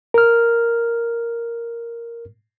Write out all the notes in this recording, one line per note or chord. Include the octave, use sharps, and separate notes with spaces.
A#4 F6